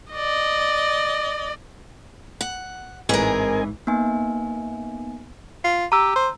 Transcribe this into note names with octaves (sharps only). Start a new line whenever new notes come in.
D5 D#5
F#5
A1 G#2 E3 C4 G#4 A#4 D#5 G#5
A#3 B3 D#4 G#5
F4
G4 A#5 E6
C5